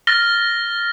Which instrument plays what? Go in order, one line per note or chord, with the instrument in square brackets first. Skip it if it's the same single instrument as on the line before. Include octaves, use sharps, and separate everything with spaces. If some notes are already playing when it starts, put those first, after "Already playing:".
[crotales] F6 A6 A#6 G7